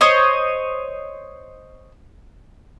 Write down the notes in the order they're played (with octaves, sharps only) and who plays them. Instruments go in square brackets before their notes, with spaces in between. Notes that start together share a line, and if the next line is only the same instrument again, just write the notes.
[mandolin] C5 C#5 D#5